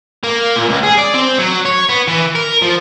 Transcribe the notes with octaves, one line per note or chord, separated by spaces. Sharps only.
A#3
A#2
C#2
G#4
D5
C4
F#3
C#5
B3
E3
A#4
F3